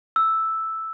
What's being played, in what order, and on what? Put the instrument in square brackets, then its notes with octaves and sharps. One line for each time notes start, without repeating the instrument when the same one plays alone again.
[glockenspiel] E6